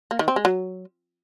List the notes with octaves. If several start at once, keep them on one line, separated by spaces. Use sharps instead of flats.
A#3
D#3
C4
G#3
F#3